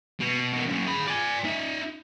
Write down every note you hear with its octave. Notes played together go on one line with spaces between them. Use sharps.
B2
B2 D#3
F#2 C#3
G#4 B5
D5 G#5
D#4 E5